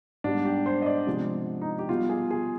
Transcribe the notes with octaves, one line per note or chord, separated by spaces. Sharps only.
G#2 G3 B3 D4
G4
C5
D#5
D5
C3 F3 G#3 B3
D#4
G4
B2 G3 B3 F4
G#4
G#4